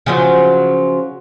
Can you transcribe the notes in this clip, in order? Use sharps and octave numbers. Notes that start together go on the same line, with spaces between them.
C#3 F3 F#3